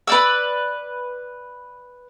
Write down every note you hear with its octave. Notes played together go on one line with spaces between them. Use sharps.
B4 D5 E6